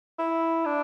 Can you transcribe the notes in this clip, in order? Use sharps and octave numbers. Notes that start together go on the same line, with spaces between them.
E4
D4